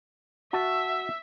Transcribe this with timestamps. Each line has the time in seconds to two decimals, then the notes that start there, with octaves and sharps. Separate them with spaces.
0.53 F#4 E5 A5